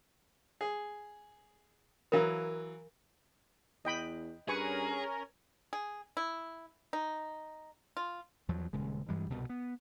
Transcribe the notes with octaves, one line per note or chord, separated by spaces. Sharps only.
G#4
E3 F#3 A#4 F5 A#5
E2 D#5 G5 B5
G2 C#4 G#4 A#4 B4 G#5 C#6
G#4
E4
D#4
F4
E2 F3 F#3
D#1 C#3 G#3
G2 E3 G3 G#3
C2 G2 B2
B3